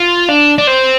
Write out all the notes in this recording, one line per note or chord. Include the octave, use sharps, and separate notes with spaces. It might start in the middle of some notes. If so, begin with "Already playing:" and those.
Already playing: F4
D4
D4
C4